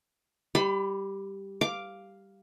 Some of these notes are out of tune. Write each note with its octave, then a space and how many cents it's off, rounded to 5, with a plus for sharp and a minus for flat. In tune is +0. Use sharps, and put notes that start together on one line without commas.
G3 +0 B5 +35
F5 +0 D6 +0